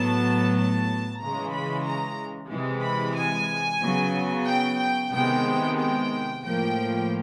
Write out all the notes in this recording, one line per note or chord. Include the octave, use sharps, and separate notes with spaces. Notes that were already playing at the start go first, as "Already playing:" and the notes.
Already playing: A2 F#3 B3 A5
A5
C#3 E3 G#3 A#5
B5
A#5
C3 E3 G#3
B5
G#5
C#3 F#3 B3
G5
G5
C3 D#3 G#3 B3 G5
G5
A2 F3 A#3 G5